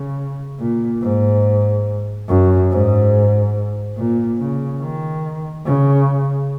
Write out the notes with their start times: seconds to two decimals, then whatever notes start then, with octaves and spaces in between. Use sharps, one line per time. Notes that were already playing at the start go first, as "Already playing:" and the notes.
Already playing: C#3
0.60 A#2
1.02 G#2
2.28 F#2
2.70 G#2
3.97 A#2
4.39 C#3
4.81 D#3
5.65 C#3